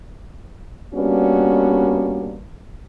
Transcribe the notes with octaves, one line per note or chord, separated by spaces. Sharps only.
G3 A#3 B3 C#4 D4 F#4